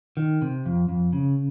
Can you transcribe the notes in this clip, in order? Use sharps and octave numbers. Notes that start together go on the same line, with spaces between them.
D#3
C3
F2
F2
C#3